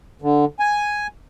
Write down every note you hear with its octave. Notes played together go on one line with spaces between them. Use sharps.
D3
G#5